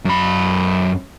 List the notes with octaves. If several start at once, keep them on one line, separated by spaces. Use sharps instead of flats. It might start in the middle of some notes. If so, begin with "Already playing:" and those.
F#2 B5